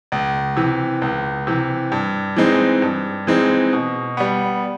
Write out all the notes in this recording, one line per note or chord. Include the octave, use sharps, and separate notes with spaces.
C#2
C3 E3
C#2
C3 E3
G2
E3 G#3 C4 D#4
G2
E3 G#3 C4 D#4
B2
G3 B3